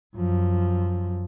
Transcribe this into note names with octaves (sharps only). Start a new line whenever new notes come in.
F#2 F3